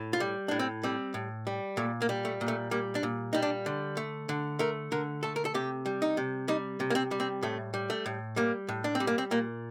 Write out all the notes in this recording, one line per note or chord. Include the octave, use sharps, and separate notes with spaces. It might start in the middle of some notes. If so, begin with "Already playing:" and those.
Already playing: A2
F4
G3
A2 D4
C4
G3 C4
A2
G3
A#2 A3
A#3
G3
A3
A#2
A3
G3 A#3
D4
A#2
G3 D#4
D4
D3
A3
D3
A3 A#4
D3 A#4
A3 A4
A#4
A4
C3 G4
G3
D#4
C3
G3 D#4
C3
A#3
C4
G3
C4
A2 A3
G3
A3
A2
G3 A#3
A2
D4
C4
G3
A#3
C4
A#2 A#3